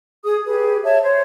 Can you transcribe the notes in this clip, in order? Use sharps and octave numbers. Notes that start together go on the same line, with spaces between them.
G#4 D#6
G4 G#4 B4
C#5 E5 A5
C5 C#5